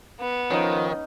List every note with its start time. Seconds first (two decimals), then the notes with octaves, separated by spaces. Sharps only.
0.19 B3
0.51 D#3 F3 C#4 D#4